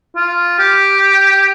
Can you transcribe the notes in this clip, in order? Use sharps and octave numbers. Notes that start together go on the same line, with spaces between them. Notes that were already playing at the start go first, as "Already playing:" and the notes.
F4
G4